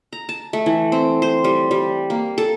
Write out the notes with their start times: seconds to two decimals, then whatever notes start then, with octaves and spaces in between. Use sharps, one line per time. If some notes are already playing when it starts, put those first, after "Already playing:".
0.13 A#5
0.29 A5
0.53 A3
0.66 E3
0.92 C4
1.22 C5
1.44 G3
1.71 G3
2.10 A#3
2.38 A4